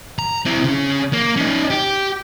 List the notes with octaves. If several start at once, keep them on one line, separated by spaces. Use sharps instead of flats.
A#5
C4 E4
C#3 C#4
A#3
C#4 D#4
G4